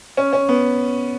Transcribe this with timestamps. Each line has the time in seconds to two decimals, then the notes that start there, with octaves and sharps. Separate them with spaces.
0.17 C#4
0.33 C#4
0.49 B3